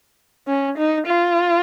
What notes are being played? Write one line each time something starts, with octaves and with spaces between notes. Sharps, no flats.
C#4
D#4
F4